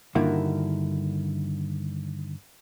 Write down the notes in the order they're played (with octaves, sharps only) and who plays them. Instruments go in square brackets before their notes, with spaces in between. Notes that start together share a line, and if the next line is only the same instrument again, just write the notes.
[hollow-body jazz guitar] G2 D3 D#3 A#3 E4 F#4